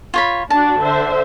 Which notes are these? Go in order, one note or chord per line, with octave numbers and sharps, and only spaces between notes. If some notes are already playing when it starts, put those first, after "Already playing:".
F4 C#5 B5
D4 F#4 A5
D3 C5 E5